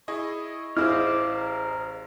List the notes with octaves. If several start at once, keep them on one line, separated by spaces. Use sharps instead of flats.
E4 G#4 D#5 C#6
A1 E4 G#4 C5 D#5 F5 D6 F6
A#4